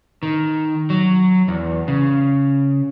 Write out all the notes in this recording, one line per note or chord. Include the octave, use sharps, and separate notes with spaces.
D#3
F#3
E2
C#3